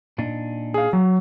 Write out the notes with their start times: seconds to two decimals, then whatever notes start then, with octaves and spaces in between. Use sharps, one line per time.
0.18 A#2 D4 D#4
0.74 G#4 F5
0.93 F#3